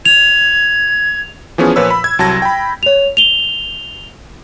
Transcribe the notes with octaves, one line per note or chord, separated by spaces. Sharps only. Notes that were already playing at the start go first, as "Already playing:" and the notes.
G#6 F7
E3 F3 B3 C#4 G#4 C#5
A#2 F3 B4 C#5 B5 E6
B5
G#6
C2 F#3 A5 G#6 A#6
G5 B5
C#5 F7
F7 G7